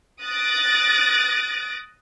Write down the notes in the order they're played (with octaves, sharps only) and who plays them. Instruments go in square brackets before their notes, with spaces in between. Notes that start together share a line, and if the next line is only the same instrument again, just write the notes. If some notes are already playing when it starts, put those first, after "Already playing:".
[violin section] D#6 F#6 A6 A#6 D7